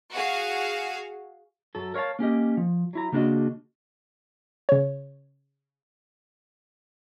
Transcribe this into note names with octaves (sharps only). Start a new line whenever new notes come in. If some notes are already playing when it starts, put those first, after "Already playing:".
F#4 G#4 F5
F#2 F#3 A4
A#4 C#5 D5 F5 A5
A#3 C#4 G4 D#5
F3
F#3 E4 A#5
C#3 A#3 D4 F#4 D#5
C#3 C#5